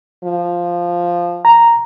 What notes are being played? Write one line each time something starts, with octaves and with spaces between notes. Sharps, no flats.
F3
A#5